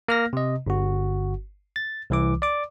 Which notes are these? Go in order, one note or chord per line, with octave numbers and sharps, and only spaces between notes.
A#3 F6 A#6
C3 D#5
G1 F#4
A6
C2 E3 D6
D5 D6